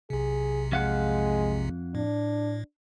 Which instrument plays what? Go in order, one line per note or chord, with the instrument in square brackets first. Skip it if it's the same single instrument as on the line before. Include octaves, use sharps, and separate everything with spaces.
[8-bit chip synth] B1 C3 [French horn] G#4
[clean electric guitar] F2 F5 F#5 [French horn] G#3
[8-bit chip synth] A2 [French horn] D4